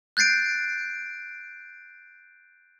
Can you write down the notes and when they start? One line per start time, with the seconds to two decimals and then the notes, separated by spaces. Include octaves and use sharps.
0.17 F#6 G6 A6 C7 D7